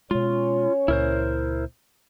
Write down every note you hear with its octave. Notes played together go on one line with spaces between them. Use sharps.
B2 G#3 C#4 F4 C#5
C#2 A#2 E4 A#4 C5